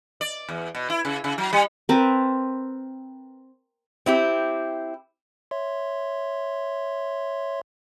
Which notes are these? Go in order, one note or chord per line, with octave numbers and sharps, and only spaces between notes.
D5
E2
B2
E4
C#3
C#3
F#3
G3
C4 A#4 B4 A5
C4 E4 G4
C#5 E5 C6